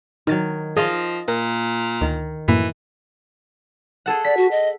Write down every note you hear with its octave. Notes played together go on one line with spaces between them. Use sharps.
D#3 F#3 D#4 A6
F3 F4 G#4 D#5
A#2 A#4
D2 D#3
F#2 A2 E3 A#3
G#4 A4 F#5
D5 B6
F#4
D#5